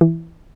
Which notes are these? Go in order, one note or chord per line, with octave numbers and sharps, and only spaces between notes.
E3